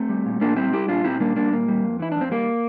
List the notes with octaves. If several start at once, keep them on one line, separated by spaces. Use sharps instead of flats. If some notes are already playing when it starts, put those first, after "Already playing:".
Already playing: A3 C4
G3
A#2
A#2 A#3 D4
G3 C4 E4
G3 E4 G4
A#2 D4 F4
A#2 C4 E4
G3 A#3 D4
G3 A#3 D4
A#2 A#3
G3
F2
E3 E4
F2 D4
C4
G3 A#3